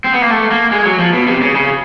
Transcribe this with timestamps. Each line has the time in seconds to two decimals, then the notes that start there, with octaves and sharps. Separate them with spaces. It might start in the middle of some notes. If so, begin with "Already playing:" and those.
0.04 C4
0.13 B3
0.22 A#3
0.30 A3
0.50 A#3
0.71 G#3
0.85 F#3
0.99 F3
1.13 B2
1.27 C3
1.41 C#3
1.55 C#3